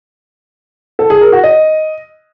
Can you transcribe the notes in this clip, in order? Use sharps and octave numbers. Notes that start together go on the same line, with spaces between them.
A4
G#4
A#4
F#4
D#5